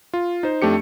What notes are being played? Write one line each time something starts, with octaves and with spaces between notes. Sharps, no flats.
F4
D#4 C5
F2 A3 D4 G4 C#7